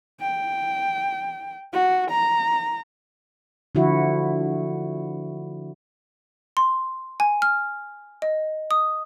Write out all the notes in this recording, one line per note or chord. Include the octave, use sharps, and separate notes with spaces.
G5
F#4
A#5
D3 F3 E4 F#4
C6
G#5
F6
D#5
D#6